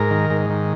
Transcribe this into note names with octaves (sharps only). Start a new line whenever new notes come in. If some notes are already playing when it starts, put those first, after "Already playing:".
Already playing: G#2 A#4
D#3
G#2
D#3